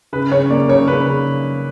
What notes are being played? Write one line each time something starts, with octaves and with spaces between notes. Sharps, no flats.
C#3 B4
C#3 C#5
A#3 D5
C#3 C#5
C#3 B4
C#3